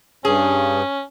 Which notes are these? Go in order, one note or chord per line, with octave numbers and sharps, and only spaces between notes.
G2 C#4 G#4